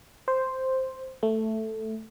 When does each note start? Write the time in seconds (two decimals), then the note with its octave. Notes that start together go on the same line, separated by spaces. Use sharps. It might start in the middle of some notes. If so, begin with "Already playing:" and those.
0.28 C5
1.23 A3